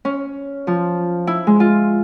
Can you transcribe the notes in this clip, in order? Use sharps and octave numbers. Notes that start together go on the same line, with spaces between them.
C#4
F3
E4
G#3
F4